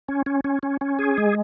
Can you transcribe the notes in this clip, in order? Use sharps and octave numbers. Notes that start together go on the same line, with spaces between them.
C#4
C#4
C#4
C#4
C#4
G#4
G#3